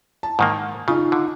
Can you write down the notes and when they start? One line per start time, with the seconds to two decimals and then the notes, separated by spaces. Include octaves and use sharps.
0.23 A5
0.39 G#2 D#3 A#3
0.88 C#3 D#4 F4
1.12 D3